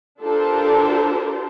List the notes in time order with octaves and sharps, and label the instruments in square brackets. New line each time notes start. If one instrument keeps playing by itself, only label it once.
[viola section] D4 F4 G4 A4 A#4 C5